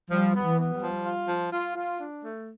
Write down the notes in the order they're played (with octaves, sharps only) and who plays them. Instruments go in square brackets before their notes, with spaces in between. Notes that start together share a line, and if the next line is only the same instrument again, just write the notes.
[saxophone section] F3 [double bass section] G3
[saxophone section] B3
[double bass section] E3
[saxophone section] B3
[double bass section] G3
[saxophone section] F3
F4
F3
F4
F4
D4
A3